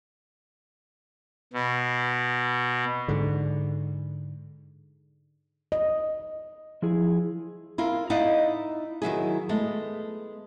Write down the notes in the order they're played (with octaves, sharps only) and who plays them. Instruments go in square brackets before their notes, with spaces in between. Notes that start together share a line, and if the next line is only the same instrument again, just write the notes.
[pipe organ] B2
[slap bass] G#2 D3
[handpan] D#5
[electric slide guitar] F3 E4 G#4
[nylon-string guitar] E4 F4 A#4
D#4 E4 D5 D#5 F5 F#5
D#3 F#3 E4 G#4
G#3 A3 B3